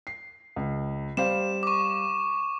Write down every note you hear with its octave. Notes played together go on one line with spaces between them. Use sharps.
C7
C#2
G3 C5 F5 E7
C#6 D6